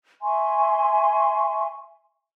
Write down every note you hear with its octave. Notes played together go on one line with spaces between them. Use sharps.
E5 G#5 C6 C#6